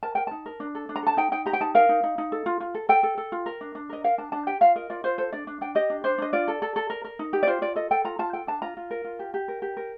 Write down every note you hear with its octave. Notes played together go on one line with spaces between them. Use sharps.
A#4 A5
A#4 G5
D#4 A5
A#4
D4
A4
D4
A#5
A4 A5
D#4 G5
D#4 G5
G4 A#5
G5
D#4 A5
A#4 F5
D#4
D#4
D#4
A4
F4
F4
A4
A4 G5
A4
A4
F4
A#4
D4
D4
A#4 D#5
A#4 F5
D4 A5
D4 A5
G4 G5
F4 F5
A#4 D#5
F4 D5
F4 C5
A4 C5
D4 D5
D4
D4 G5
G4 D#5
D4
D4 C5
D4 D#5
F4 D5
A4
A4
A4
A#4
A#4
D#4
G4
D5
F4 C5
F4 D5
A4 D#5
A4 G5
F4 A#5
F4 A5
A4 G5
D4 A5
F4 A#5
F4
A#4
F4
G4
G4
A#4
G4
A#4